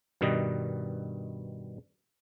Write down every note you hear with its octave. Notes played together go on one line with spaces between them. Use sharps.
G2 B2 D#3 G3 D#5